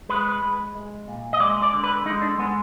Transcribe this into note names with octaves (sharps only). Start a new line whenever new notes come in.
G#3 B4
G#3
G#3
A#2
D#5
G#3 D5
D5
D3
B4
G#3 D#4
D4
G#3 B3